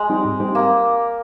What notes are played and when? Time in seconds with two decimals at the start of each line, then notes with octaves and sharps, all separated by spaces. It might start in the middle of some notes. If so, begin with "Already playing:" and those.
Already playing: G#3
0.09 G3 C4 D#4 G4
0.25 G#2
0.40 G3 C4 D#4 G4
0.55 A#3